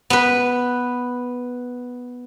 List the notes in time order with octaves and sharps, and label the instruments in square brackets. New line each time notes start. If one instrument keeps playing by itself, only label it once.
[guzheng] B3 B4